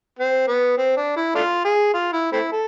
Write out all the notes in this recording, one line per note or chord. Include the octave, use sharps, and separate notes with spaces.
C4
B3
C4
D4
E4
A3 D4 F4
G#4
F4
E4
A3 C4 E4
A4